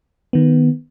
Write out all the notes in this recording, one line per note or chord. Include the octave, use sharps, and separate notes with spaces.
D#3 B3